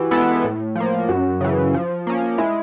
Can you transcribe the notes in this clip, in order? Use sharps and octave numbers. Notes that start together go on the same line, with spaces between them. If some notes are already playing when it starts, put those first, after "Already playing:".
Already playing: E3 F#4 G4
G#3 B3 E4 A4
A2
F3 A#3
F#2 F#4
C#3 E3
F3
A#3 C#4
G#3 E4